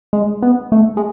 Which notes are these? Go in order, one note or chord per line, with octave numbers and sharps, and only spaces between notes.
G#3
B3
A3
G#3